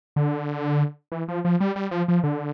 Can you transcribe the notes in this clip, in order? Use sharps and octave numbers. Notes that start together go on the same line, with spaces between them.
D3
E3
F3
F3
G3
G3
F3
F3
D3